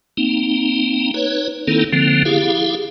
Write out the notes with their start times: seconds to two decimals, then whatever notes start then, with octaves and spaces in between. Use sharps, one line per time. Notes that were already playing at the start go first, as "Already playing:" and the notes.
0.17 A#3 C4 D#4
1.14 D#4 B4 C#5
1.67 D#3 A#3 C4 D#4 E4 A4
1.93 D3 F3 A#3 C4
2.25 E4 G4 G#4 F5